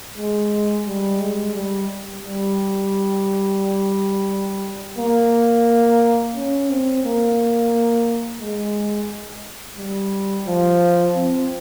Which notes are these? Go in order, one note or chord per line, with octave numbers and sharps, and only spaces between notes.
G#3
G3
G#3
G3
G3
A#3
C#4
C4
A#3
G#3
G3
F3
C4